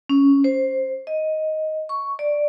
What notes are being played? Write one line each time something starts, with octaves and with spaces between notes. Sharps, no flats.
C#4
C5
D#5
C#6
D5